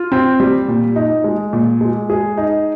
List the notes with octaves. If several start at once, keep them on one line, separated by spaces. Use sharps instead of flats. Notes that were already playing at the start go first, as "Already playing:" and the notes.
Already playing: F4
C4
G3
A#2
D#4
G#3
A#2
G#3
G#4
D#4